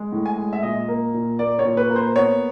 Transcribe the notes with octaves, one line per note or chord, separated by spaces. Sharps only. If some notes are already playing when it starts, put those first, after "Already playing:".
Already playing: G#3
A2
G#5
G#3
E5
A#2 D#5
A#3
A#2
A#3 D5
C#5
A#2
B4
A#3
C5
B3 C#5